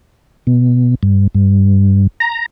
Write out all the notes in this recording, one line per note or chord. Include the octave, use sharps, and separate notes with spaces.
B2
G2
G2
A#5